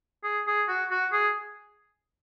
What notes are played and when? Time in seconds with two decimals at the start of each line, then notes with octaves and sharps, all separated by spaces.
0.24 G#4
0.47 G#4
0.68 F#4
0.91 F#4
1.12 G#4